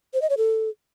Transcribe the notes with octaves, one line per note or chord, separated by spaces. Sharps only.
C5
D#5
C#5
A4